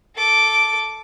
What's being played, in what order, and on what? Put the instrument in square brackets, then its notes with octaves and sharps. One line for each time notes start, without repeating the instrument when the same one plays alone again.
[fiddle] A4 D6